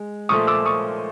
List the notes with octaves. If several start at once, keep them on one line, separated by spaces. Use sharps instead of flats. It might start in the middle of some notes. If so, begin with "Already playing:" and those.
Already playing: G#3
A#2 F3 A3 C#6 D#6
D6 E6
C#6 D#6